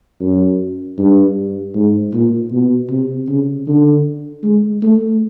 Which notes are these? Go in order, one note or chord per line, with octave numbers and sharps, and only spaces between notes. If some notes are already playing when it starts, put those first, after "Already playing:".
F#2
G2
G#2
A#2
B2
C3
C#3
D3
G#3
A3